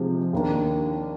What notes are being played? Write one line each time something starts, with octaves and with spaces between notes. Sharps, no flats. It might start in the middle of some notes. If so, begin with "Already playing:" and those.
Already playing: C3 F3 G#3 D#4 G4
D#2 D#3 A#3 D4